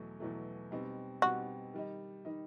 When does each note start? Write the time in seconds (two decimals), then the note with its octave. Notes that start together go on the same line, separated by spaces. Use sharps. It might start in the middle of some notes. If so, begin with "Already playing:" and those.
Already playing: E2 B2 F#3 A3
0.20 E2 B2 F#3 A3
0.71 B2 G3 C4 D#4
1.22 B2 G3 C4 D#4 F#4
1.74 D#3 G3 D#4
2.25 D#3 G3 D#4